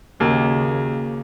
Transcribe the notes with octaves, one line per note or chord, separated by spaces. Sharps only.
D#2 C#3 A#3 C#4 F#4